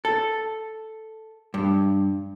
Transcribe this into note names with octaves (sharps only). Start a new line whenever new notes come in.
A4
G2